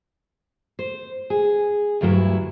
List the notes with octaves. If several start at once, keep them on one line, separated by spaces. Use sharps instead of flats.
C5
G#4
D2 G2 F#3 E4